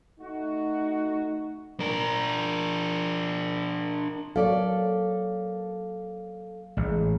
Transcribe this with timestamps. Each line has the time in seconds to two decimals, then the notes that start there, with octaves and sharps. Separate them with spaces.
0.20 A3 D#4 F#4
1.80 D4 A#4
4.36 F#3 A#3 A4 C#5 D5 F5
6.77 A1 G#3